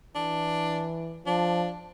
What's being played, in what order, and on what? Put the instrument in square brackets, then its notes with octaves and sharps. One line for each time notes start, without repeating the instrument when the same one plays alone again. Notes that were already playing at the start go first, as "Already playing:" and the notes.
[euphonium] E3 [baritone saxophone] D4
[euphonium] F3 [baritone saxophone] D4